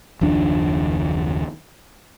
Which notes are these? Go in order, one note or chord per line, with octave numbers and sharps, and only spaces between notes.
F#1 D#2 F3 D4